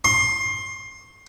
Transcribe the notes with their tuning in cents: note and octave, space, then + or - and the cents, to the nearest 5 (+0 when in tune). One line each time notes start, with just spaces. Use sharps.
C6 +20